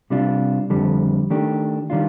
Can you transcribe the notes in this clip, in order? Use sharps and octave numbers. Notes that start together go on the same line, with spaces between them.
C3 G3 D4 F4
F2 D3 G3
D#3 A3 D4 G4
D#3 G3 D4 F4